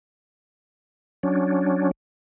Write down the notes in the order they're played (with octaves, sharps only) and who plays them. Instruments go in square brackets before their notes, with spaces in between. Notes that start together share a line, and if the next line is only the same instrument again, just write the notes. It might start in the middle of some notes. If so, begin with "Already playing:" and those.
[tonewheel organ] F#3 C#4 D4